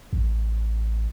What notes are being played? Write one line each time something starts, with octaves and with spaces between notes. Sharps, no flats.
A1